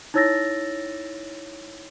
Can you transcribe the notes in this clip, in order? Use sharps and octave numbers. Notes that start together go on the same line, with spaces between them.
D#4 E4 C#5 E6 A6 A#6